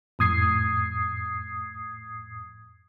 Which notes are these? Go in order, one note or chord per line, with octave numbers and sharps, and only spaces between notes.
F2 A2 D#6 G#6 C7